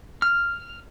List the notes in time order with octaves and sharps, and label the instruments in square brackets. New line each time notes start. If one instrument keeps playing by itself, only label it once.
[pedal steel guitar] F6